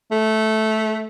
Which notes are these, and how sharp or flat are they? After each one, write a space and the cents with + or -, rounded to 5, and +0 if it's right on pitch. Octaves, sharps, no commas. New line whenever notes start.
A3 -10